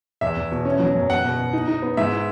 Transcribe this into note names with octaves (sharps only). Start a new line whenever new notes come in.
E2 E5
E2
B2
C#4
F#3
F#2
B2 F#5
B2
B2
D#4
D#4
B3
G#2 E5
E4